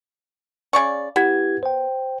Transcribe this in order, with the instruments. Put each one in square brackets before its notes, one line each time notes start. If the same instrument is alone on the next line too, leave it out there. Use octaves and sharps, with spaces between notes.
[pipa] C#3 D5 C#6
[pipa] B3 [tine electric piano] E4 G4 G#6
[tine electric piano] C5 G5